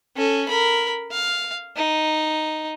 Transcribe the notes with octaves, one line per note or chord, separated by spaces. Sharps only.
C#4 A4
A#4 B5
F5
D#4